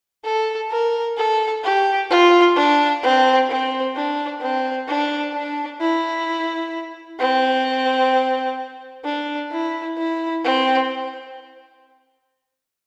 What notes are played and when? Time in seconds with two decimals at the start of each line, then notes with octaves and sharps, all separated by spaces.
0.24 A4
0.71 A#4
1.17 A4
1.64 G4
2.10 F4
2.56 D4
3.03 C4
3.50 C4
3.96 D4
4.42 C4
4.88 D4
5.34 D4
5.81 E4
7.20 C4
9.05 D4
9.52 E4
9.97 E4
10.44 C4